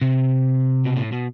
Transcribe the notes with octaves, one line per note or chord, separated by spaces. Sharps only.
C3
B2
A2
B2